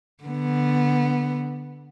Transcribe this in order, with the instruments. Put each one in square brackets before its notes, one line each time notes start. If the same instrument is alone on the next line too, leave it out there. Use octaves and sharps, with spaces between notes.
[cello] D3 B3